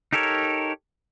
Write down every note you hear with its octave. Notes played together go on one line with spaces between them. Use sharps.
D#4 G4 A4 A#4 C#5